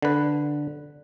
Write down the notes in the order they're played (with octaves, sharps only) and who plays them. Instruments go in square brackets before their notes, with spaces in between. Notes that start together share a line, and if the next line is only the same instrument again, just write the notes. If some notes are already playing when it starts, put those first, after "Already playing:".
[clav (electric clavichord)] D3 B4